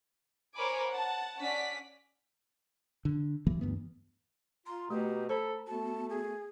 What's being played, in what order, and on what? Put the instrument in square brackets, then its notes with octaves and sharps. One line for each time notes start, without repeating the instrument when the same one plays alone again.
[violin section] A#4 C5 C#5 G#5 B5 D6
F#5 A5
C#4 D5 F#5 B6
[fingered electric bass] D3
C#2 E3 F#3 A#3
D2 G2 E3 B3
[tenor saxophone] F4 [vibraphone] A#5 [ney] C6
[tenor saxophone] B2 [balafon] A3 [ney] G4
[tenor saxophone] A4 [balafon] C5 [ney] B5
[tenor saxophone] A3 [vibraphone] B3 F#4 [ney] A5
[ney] G#4